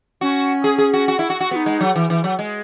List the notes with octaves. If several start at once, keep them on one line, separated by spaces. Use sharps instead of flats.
C#4 F#4
G#4
G#4
F#4
F#4
E4
F#4
F#4
B3 D#4 F#4
G#3
F#3
E3
E3
F#3
G#3